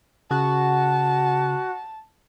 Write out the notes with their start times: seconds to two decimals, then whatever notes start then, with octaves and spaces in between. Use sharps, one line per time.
0.31 C#3 F#4 A5